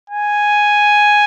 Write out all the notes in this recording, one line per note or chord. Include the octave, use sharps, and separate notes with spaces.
G#5